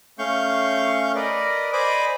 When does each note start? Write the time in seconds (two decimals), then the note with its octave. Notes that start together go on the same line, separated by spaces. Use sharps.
0.19 A3 C#4 F5 C#6 G6
1.15 A#4 B4 D5 D#5
1.73 C5 D5 D#5 G#5 B5 D6